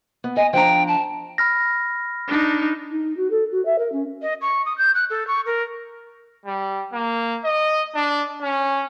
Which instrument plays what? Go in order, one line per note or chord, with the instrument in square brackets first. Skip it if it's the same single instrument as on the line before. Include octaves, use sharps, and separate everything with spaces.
[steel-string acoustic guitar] B3
[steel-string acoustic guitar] D#5 [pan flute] G#5
[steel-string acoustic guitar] F3 D4 A#5 [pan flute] G5
[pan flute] A5
[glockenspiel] B5 F6 A#6
[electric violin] D4 D#4
[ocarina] D#4
F#4
A4
F#4
E5
A#4
C#4
[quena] D#5
C#6
D#6
G6
F#6
A4
C#6
A#4
[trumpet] G3
A#3
D#5
D4
C#4